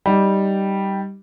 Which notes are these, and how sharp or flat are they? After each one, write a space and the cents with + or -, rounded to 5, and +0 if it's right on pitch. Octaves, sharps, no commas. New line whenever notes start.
G3 -5 D#4 +0